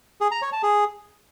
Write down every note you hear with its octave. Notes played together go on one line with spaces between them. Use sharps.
G#4
A#5
C#5
A5
G#4